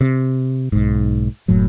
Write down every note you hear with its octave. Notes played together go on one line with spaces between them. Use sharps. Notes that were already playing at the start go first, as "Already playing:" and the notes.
C3
B1 G#2
F#1 F#2 A2 F#3